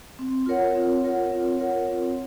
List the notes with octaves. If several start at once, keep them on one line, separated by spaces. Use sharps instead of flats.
C4
F4 A#4 C#5 F#5
C4
F4 A#4 C#5 F#5
C4
F4 A#4 C#5 F#5
C4